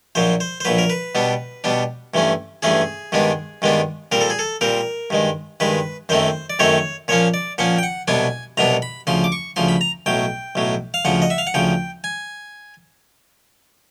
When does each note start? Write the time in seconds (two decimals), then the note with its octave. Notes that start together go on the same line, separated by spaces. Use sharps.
0.15 A#1 A#2 F#3 C5
0.40 C5
0.60 C5
0.65 A#1 A#2 F#3 B4
0.78 A#4
0.90 B4
1.15 B2 G3 B3 D4
1.64 B2 G3 B3 D4
2.14 G2 E3 A3 C#4
2.63 G2 E3 A3 C#4 G#4
3.12 G2 D#3 G#3 B3 D4
3.62 G2 D#3 G#3 B3 D4
4.12 A#2 G3 C4 A#4
4.21 A4
4.30 G#4
4.39 A4
4.61 A#2 G3 C4 A#4
5.10 G2 D#3 G#3
5.60 G2 D#3 G#3 B4
6.09 F#2 D#3 F#3 A3 C4 C5
6.50 D5
6.59 F#2 D#3 F#3 A3 C4 C#5
7.08 A#2 F3 A#3 C#4 C#5
7.34 D5
7.58 A#2 F3 A#3 C#4 F#5
7.78 G5
7.83 F#5
8.08 C2 B2 F#3 B3 D4 G#5
8.57 C2 B2 F#3 B3 D4 A#5
8.82 B5
9.07 D2 C#3 F3 C6
9.24 D6
9.32 C#6
9.56 D2 C#3 F3 C6
9.68 B5
9.81 A#5
10.06 B1 A2 F#3 G5
10.55 B1 A2 F#3
10.94 F5
11.05 D2 C#3 F3 F#5
11.22 D#5
11.30 E5
11.38 F5
11.47 F#5
11.54 D2 C#3 F3 G5
12.04 G#5